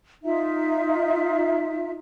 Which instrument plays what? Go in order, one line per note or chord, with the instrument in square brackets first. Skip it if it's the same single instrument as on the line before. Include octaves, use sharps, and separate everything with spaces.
[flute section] D#4 F4 E5